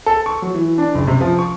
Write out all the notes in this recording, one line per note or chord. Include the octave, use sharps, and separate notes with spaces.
A4
C#6
F#3
E3
D4
F#1
C3
F3
C#6